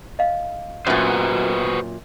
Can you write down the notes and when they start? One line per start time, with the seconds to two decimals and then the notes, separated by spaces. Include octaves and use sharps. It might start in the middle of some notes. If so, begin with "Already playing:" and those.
0.19 D#5 F5
0.87 F#2 A#2 F#4 B4 C5